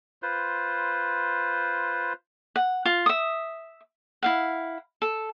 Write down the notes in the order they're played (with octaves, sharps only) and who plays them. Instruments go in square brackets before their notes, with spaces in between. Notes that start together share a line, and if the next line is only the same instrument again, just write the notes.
[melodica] F4 B4 C5
[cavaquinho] F#5
F4
E5 D#6
E4 F5 F#5
A4